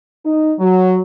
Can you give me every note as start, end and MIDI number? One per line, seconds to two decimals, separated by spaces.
0.24 0.53 63
0.59 0.99 54